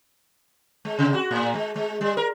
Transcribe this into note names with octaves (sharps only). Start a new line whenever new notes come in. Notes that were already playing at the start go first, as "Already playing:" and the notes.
G#3
C3
F#4
A2
G#3
G#3
G3
A#4